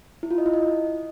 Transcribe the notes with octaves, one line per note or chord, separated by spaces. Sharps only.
E4
F4
D#5
E4
D#5